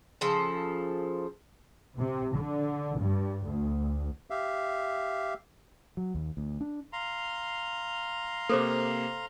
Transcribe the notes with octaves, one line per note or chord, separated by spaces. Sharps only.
C#3 F3 A4
C3
D3
G2
D2
G4 E5 F5
F#3
D#2
D2
D4
F5 A#5 C6
C3 A#3 A4 C5 D6